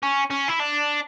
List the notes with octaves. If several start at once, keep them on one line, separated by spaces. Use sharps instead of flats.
C#4
C#4
E4
D4